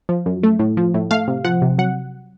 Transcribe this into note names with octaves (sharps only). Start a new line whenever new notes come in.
F3
F#2
A3
A2
F3
A2
A3 F5
C3
F3 F#5
C3
F#3 F#5